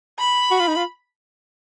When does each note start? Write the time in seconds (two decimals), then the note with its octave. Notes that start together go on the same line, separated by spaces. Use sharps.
0.19 B5
0.51 F#4
0.60 F4
0.68 D#4
0.76 F4